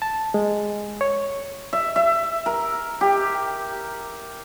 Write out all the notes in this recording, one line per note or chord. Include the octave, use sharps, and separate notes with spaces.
A5
G#3
C#5
E5
E5
A#4
G4